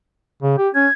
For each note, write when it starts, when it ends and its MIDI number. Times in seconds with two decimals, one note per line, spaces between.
0.42 0.55 49
0.58 0.69 67
0.75 0.87 61
0.75 0.93 92